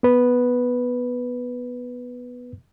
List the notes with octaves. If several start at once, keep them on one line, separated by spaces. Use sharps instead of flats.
B3 B4